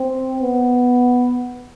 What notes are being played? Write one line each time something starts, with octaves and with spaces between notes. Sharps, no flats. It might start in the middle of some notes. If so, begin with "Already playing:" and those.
Already playing: C4
B3